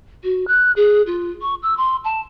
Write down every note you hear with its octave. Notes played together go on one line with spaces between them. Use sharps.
F#4
F#6
G#4
F4
C#6
E6
C6
A5